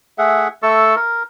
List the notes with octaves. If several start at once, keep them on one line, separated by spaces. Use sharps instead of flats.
A3 G#4 E5 F#5
A3 A4 C#6 E6
A#4